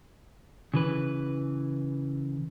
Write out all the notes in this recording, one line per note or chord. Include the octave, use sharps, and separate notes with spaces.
C#3 E3 B4